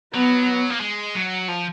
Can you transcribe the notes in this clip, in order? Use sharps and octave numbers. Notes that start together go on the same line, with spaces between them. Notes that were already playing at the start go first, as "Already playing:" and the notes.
F#3 B3
A#3
G#3
F#3
F3